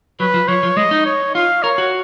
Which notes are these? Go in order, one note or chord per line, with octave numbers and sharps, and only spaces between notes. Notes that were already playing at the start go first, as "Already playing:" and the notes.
F#3 B4
F3
F3 C#5
F3
G#3 D#5
D#4
C#5
F4 F5
A#4 C#5
F#4